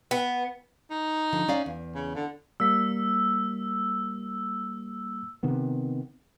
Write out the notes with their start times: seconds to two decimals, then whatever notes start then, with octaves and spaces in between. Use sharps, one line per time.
0.11 B3
0.91 D#4
1.33 D3 F3
1.48 C#4 D5 F5
1.66 E2
1.95 C#3
2.16 D3
2.60 G3 A#3 E6 B6
5.43 C3 D#3 B3